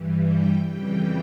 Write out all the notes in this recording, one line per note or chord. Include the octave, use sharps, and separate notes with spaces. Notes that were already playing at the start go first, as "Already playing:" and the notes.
Already playing: G2 E3 G3
G5
F2 C#3 E3 G3 G5